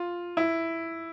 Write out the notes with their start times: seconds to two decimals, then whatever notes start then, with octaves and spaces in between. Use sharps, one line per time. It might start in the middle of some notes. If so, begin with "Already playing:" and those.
Already playing: F4
0.37 E4